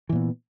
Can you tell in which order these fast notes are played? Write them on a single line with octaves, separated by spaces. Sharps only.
E3 A#2 B3